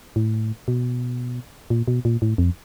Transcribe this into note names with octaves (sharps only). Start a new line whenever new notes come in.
A2
B2
A#2
B2
A#2
A2
F2